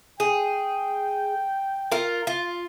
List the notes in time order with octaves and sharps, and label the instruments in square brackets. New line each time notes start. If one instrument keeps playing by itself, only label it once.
[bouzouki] G#4 [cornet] G5
[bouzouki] F4 A#4
F4